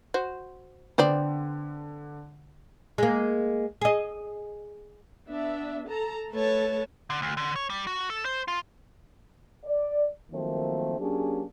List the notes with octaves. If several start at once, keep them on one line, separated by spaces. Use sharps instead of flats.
F#4 C5
D3 B3 C4 D5
G#3 A#3
G#4 D#5
B3 D4 E5
A4 A5 A#5
A3 A4 B4 C#5 A5
D3
D2
D3
C#5
G3
F#4
A4
C5
F4
D5
D#3 F3 F#3 A3 A#3 C4
F#3 A#3 C#4 D4 G4 G#4